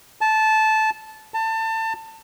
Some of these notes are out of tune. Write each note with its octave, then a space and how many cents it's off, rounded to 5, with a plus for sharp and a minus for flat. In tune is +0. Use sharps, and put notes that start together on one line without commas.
A5 -15
A5 +25